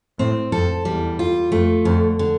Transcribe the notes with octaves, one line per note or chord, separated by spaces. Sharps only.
A2 C4
F2 A4
E2 G3
F4
F2 A3
F2 D3
D3